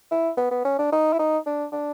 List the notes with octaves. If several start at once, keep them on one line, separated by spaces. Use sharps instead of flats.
E4
B3
B3
C#4
D4
D#4
E4
D#4
D4
D4